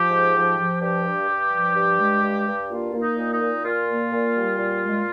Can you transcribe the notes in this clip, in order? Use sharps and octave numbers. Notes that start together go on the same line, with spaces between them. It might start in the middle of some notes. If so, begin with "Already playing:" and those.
Already playing: F3 G4
G#2
F3
F3
G2 G4
G2
G2
F3
G2
G#3
G2
G2
A#3 F4
A#3 F4
D#4
A#2
D#4
A#2
A#2 F4
A#3
A#2
G3
A#2
G#3